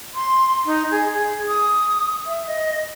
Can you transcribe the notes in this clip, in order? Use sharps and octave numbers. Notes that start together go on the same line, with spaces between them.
C6
D#4
G#4
G#4
D#6
E5
D#5